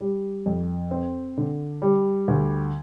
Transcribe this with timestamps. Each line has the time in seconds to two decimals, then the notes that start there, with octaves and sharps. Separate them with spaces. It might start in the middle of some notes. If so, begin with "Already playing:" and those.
0.01 G3
0.46 F2
0.91 C4
1.37 D3
1.82 G3
2.28 D2